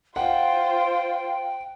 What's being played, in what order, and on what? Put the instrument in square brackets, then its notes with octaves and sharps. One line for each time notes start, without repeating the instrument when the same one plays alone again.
[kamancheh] F4 C5 [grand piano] F#5 [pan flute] G5